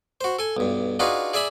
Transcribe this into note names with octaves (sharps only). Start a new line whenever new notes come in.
F#4 C5
A4 G#5
B1 G2
D4 D#4 F4 F#4 G#4 B4
G#4 D5 E5 G#5 B5